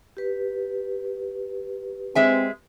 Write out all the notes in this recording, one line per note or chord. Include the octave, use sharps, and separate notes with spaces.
G4 B4
G#3 C4 E5 G#5